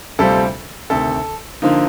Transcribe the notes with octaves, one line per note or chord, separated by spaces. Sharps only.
D2 C3 G3 C4 F4 A4
D2 C3 D#3 A4
D3 F3 A#3 D#4